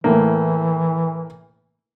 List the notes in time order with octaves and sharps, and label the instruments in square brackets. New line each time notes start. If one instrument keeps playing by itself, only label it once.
[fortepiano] A2 A#3 [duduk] E3